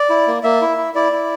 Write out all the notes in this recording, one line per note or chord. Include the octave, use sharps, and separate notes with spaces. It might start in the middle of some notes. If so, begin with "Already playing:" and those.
Already playing: D5
E4
A#3
A#3 E5
E4
E4
E4 D5
E4